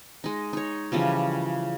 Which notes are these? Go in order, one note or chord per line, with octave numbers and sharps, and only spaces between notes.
G#3 D#4
D#4 C#5
C#3 E3 F3 G3